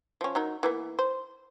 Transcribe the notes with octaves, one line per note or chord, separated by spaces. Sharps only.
F3 C#4
F#3 D#4 A#4
E3 A#3 B3
C5